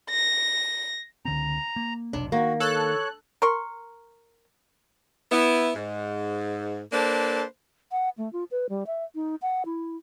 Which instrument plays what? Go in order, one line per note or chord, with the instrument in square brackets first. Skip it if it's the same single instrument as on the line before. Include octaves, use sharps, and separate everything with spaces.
[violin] A#6
[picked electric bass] C#2 D3 C4 [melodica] A#5
[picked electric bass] A#3
[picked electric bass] F1 B1 C3 [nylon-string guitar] D4
[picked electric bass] D#3 [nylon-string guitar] A#3 [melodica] F#4
[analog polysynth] A4 F#6 [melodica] C#5
[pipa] A#4 C6 C#6
[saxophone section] B3 E4
G#2
A#3 D4 A4 B4 C5
[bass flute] F#5
A3
F4
B4
G3
E5
D#4
F#5
E4